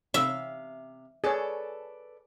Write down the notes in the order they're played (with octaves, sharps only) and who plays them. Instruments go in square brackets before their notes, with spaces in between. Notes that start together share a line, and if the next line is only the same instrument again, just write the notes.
[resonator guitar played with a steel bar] C3 F5 [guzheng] E5
[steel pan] G#4 C#5 [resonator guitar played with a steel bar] A4 B4 D5